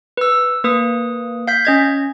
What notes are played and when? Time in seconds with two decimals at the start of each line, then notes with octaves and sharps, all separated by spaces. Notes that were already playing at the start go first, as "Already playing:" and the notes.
0.17 B4 E6
0.64 A#3 B4 D#6
1.48 F5 G6 B6
1.65 C#4 D#5 G#6